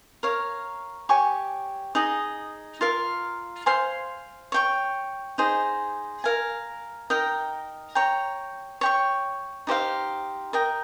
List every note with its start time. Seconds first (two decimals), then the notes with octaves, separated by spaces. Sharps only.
0.23 A#4 C#5 F5
1.09 G4 C#5 G#5 C#6
1.95 D#4 G#4 D#5
2.81 F4 A#4 F5
3.66 C5 F5 G#5 C6
4.52 C#5 G5 C#6
5.38 D#4 G#4 C5
6.24 A#4 F5 G#5
7.10 D#4 A#4 D#5 G5
7.95 C#5 G5 A#5
8.81 C#5 G5 C#6
9.67 D#4 G4 C5 F5
10.53 A#4 D#5 G5